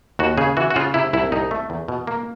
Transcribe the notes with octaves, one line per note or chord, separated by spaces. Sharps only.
D#2 F#4
C#3 G#4
E3 F#4
F#4
C#3 F4
C3 E4
C2 E4
C2 D#4
A3
E2
B2
A#3